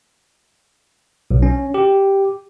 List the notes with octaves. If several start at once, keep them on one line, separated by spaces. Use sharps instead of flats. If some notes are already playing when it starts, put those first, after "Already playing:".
B1
C#4
G4